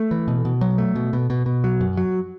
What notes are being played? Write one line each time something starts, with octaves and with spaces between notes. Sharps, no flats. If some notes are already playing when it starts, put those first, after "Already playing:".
Already playing: A3
E3
B2
B2
F#3
A3
B2
B2
B2
B2
F#3
F#2
F#3